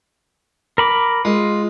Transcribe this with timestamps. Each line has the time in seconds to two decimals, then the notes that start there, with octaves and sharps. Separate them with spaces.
0.78 A#4 B5 D6
1.25 G#3 F4